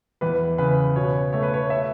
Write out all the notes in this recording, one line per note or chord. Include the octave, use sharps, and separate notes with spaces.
E2 B4
C#3 B4
B2 C#5
A3 C#5
B4
C#5
E5